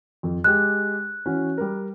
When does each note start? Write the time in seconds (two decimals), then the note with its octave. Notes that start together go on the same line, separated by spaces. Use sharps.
0.23 F2
0.44 G#3 G4 F#6
1.26 E3 C#4 F#4
1.58 G3 A#4